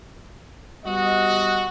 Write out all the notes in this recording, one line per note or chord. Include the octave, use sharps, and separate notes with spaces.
G3 B3 F#4 D#5